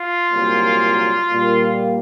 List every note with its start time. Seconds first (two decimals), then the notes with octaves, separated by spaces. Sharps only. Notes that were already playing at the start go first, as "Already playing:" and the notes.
Already playing: F4
0.31 C2 A#2 F#3 A#3
1.31 A#2 G3 A#3